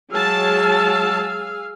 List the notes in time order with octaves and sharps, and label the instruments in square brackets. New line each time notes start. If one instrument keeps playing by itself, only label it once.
[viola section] F#3 G#3 A5 [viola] G#4 F5 [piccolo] E6